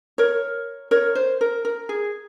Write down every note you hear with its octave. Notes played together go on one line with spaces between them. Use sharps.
A#4 C#5
A#4 C#5
C5
A#4
A#4
G#4